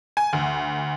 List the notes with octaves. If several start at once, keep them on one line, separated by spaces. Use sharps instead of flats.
G#5
D2